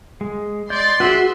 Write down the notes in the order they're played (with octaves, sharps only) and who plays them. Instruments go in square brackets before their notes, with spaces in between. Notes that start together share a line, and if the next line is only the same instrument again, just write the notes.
[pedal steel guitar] G#3
[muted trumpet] D5 [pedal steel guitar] D#5 G6 [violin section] C6
[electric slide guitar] F#4 [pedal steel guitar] G#4 B4 [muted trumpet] E5